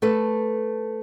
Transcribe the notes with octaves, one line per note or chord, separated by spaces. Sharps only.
A3 A4 B4